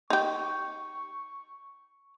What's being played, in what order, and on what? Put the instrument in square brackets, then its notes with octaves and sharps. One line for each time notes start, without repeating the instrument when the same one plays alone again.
[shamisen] D#4 G4 [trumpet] C#6